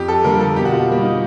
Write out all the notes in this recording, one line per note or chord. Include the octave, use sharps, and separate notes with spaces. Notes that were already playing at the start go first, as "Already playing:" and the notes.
Already playing: F2 G4
A4
D3 G3 A#3 A#4
A4
B2 G4
F#4
F4
G3 A#3
D#4